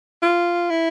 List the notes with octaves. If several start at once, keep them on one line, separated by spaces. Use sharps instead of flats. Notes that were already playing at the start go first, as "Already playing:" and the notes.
F4
E4